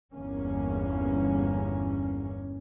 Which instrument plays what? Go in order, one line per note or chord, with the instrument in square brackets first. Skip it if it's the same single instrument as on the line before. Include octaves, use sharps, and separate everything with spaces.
[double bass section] G1 E2 A#3 C#4